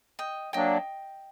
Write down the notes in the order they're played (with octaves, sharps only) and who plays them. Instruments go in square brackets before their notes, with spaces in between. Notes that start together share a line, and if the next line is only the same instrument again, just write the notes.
[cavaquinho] D#5 G5
[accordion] F#3 A#3 D4 [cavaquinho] D#5 G5